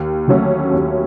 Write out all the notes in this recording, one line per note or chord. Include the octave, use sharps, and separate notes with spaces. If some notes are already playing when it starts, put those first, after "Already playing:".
Already playing: D#2
D3 F#3 A3 C#4
D#2